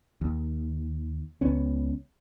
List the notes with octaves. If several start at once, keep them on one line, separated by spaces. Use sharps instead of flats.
D#2
C#2 B3 C#4